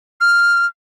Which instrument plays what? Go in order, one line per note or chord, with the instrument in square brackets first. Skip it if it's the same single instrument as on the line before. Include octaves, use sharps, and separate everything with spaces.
[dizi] F6